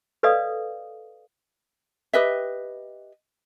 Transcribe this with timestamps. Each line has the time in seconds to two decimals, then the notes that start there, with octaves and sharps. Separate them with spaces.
0.23 A4 B4 D5 D#5 F5 D#6
2.13 G4 B4 D#5 E5